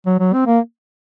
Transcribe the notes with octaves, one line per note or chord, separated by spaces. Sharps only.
F#3
F#3
C4
A#3